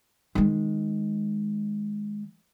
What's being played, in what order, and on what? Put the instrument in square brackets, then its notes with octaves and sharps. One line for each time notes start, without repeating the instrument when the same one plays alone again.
[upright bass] D#3 G#3